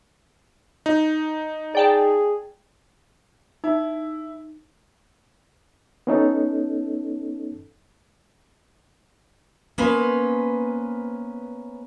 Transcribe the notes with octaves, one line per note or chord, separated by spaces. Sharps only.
D#4
G#4 D5 G5 A5
D#4 E4
B3 C#4 D#4 A4
A#3 B3 C#4 B4 C5